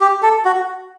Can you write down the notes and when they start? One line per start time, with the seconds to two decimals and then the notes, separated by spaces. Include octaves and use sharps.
0.01 G4
0.22 A4
0.45 F#4